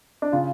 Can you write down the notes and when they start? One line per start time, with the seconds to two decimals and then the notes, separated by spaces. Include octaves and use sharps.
0.22 D4
0.32 C#3 F4